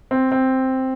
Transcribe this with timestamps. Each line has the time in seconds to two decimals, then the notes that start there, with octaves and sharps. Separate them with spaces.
0.11 C4
0.32 C4